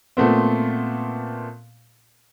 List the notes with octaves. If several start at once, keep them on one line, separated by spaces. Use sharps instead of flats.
A#2 A3 B3 C4